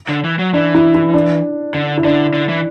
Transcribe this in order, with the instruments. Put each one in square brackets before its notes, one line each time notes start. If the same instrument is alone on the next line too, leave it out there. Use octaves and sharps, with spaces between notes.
[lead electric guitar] D3
E3
F#3
[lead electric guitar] E3 [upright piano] D4
[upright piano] E4
E4
D4
[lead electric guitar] D3 [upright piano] D4
[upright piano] E4
[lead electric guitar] D3 [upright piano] D4
[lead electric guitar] D3
E3